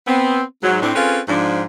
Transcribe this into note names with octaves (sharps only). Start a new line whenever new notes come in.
B3 C4
G#2 F#3
A2 C4 D4
C4 C#4 F4 G#4 A4 B4
G#2 F3 D4